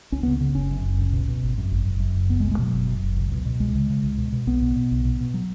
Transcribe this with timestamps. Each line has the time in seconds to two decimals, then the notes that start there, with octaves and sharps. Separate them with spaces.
0.12 C#2 C#4
0.23 C#3 B3
0.41 C#3
0.55 F#1 C#4
0.70 F#2
0.85 F#1
0.98 C#2
1.13 B2
1.28 B2
1.43 G#1
1.58 F#2
1.71 G#1
1.87 F#1
2.00 F#2
2.15 F#1
2.29 C#2 B3
2.40 G#3
2.44 B2
2.51 G#3
2.59 B2 F#3
2.72 F#1
2.87 F#2
3.03 F#1
3.16 C#2
3.32 B2
3.45 B2
3.60 C#2 G#3
3.75 C#3
3.90 C#3
4.03 C#2
4.18 B2
4.32 B2
4.47 B1 B3
4.61 B2
4.76 B2
4.91 B1
5.05 B2
5.20 B2
5.34 F#3